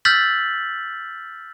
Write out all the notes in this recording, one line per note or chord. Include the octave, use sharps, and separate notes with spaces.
E6 F6 G6 A6 B6 F#7